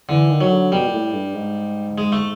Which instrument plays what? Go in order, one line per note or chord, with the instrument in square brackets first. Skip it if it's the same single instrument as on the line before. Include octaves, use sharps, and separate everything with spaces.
[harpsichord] D3 [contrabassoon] E3
[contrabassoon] D#3
[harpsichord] F#3
[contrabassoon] D3
[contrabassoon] B2 [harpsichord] G3
[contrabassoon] A#2
A2
G2
G#2
[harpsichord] G#3
A3